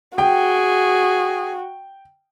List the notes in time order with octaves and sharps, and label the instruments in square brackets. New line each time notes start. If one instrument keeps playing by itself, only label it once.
[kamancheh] F#4 [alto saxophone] G#4 [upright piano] G5